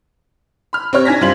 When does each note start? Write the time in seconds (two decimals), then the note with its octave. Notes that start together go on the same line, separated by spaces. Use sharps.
0.73 B5 F6
0.93 C4 G4 C#5 F6
1.05 D4 D#4 G#5 G#6 A#6 B6
1.21 F#2 G3 F4 C5 F#7